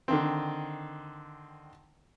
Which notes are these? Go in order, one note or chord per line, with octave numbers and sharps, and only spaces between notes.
D3 D#3 C4